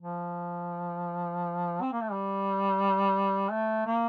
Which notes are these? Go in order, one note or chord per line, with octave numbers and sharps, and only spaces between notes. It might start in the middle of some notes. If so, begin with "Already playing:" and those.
F3
C4
A#3
A3
G3
A3
A#3